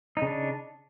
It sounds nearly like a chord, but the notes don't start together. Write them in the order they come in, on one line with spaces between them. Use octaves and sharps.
D#4 C#3 D4